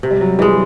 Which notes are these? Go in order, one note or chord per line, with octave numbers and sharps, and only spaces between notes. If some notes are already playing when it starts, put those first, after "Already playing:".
C3
G3
F#3
E3 G3 G#3